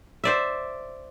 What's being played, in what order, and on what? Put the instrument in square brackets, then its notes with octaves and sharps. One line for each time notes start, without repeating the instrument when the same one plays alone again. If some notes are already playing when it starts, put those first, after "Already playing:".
[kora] C5 D5 E5